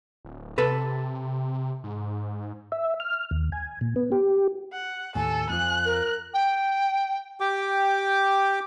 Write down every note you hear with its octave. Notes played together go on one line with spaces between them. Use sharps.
D1
C3 A4 B4
G#2
E5
F6
D#2
G#5
A#2
B3
G4
F#5
D#2 A2 A4 G#5
F2 F3 F#6
A#4
G5
G4 G5 D6